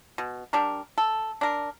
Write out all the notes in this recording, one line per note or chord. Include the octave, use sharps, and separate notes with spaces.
B2
G3 D4 A#4
A4
D4 A#4